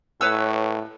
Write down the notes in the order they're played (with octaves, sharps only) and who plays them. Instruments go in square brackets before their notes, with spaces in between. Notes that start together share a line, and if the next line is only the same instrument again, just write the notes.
[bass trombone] A2 [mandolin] B4 C#5 E6